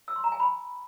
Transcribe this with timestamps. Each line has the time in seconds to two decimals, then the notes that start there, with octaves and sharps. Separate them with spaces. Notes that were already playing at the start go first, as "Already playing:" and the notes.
0.08 E6
0.16 C6
0.24 A#5
0.32 G#5
0.40 B5